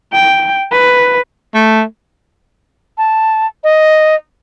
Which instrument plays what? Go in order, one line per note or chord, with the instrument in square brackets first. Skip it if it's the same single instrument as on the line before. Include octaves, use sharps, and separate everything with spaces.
[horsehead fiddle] G5
B4
[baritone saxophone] A3
[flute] A5
D#5